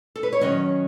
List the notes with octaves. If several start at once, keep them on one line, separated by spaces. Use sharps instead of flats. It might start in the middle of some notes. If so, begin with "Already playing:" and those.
A4
B4
C#5
D#3 F#3 C#4 D#5